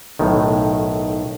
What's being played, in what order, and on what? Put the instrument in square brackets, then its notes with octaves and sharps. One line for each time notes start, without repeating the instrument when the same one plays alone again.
[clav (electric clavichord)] B1 A2 D#3